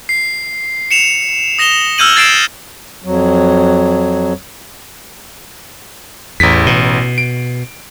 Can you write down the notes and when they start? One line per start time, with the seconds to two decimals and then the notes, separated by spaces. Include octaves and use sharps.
0.09 C7
0.91 C#7 E7 F7
1.58 D#6 A#6 E7 F7 G7
1.98 E6 F6 G6 G#6 D#7 F#7
2.16 G#6 A6 C7 D7 E7
3.04 F2 F#3
6.40 A1 E2 B6
6.66 B2
7.18 D7